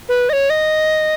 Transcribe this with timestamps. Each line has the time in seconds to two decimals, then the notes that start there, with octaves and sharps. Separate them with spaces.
0.09 B4
0.29 D#5
0.33 C#5
0.50 D#5